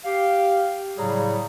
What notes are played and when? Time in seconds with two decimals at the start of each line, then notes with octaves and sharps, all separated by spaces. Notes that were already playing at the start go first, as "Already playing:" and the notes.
0.05 G4 F5
0.97 A2 C#3 F#3 G3 G#4 A#5